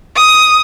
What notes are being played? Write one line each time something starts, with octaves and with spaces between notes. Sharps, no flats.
D#6